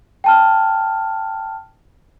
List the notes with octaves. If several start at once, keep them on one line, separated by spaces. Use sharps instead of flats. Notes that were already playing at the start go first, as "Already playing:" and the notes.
G5 A5 F6